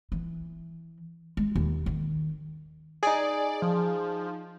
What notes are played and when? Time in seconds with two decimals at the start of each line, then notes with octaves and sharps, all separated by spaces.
0.12 E3
1.37 G#3
1.56 D#2
1.86 D#3
3.03 D#4 G#4 D5
3.62 F3